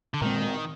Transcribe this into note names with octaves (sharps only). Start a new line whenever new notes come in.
D3
A#2 D#3 G#3 C4